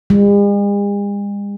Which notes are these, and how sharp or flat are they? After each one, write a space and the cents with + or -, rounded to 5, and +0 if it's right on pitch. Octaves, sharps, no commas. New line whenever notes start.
G#3 -45